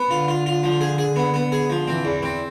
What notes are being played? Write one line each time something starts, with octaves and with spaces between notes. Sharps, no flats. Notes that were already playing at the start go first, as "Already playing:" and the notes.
Already playing: B3
D3 F4
F4
F4
F3
G#4
G#4
B3
B3
G#4
F3
E3 C4
E2
C4